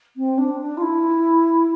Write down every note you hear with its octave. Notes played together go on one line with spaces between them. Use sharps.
C4
D4
D4
F4
E4